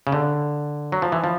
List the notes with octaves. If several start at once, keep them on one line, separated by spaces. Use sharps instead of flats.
C#3
D3
F#3
F3
E3
F3